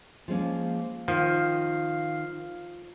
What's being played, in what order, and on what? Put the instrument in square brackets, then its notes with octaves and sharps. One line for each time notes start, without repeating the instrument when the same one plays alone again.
[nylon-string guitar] F3 G#3 C#4 [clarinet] A#3
[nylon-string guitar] D#3 [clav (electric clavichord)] F3 [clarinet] F5